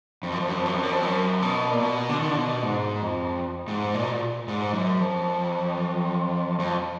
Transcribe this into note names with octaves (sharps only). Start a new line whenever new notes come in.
F2
F#2
F2
F#2
F2
F#2
F2
F#2
F2
F#2
B2
A#2
B2
D3
D#3
D3
B2
G#2
F2
G#2
A#2
B2
A#2
G#2
F#2
F2
F2